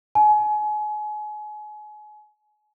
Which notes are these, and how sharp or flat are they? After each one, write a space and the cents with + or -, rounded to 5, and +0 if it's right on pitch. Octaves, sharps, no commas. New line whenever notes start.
G#5 +30